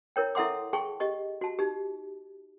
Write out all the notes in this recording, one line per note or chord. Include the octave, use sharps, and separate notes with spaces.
E4 A#4 C#5 G5
E4 A4 E5 F#5 C6 D6
G#4 G5 A5 C6 C#6
G4 D#5 C#6
F#4 A5
D#4 G4